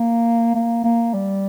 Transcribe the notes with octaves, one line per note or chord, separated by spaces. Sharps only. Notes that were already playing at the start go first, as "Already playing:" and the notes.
Already playing: A#3
A#3
A#3
G3